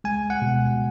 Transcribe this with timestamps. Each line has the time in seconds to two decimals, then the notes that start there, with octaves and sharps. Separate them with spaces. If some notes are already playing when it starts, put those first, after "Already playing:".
0.04 G#3 G#5
0.30 F#5
0.42 B2